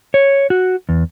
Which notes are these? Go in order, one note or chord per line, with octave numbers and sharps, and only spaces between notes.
C#5
F#4
E2